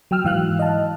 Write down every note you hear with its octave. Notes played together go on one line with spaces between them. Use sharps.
F#3 G5 E6 F6
G#2 E3 F5 F6 F#6
D#5 A5